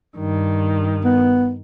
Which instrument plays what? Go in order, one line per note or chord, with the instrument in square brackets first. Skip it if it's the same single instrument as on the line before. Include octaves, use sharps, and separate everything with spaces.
[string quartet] G2 D#3
[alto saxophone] B3